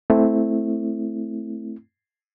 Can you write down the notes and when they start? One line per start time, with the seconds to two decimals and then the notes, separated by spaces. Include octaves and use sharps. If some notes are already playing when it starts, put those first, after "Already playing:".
0.10 A3 C4 E4